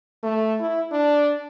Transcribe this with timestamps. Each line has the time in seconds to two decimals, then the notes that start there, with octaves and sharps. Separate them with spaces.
0.23 A3
0.60 E4
0.92 D4